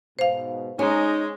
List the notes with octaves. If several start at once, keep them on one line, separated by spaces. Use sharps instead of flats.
G#2 B2 C5 F5
G#3 C#4 D#4